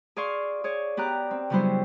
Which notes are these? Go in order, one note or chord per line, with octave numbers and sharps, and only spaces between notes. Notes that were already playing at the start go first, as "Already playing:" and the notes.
G#4 D5 F5 C6 C#6
G#4 C#5 D5
B3 G4 D5 A#5 F#6
C4
C#3 F#3 G3 B3 E4 C5